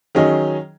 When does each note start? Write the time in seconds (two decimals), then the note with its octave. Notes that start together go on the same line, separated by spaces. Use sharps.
0.15 D#3 F#3 C#4 G#4 D#5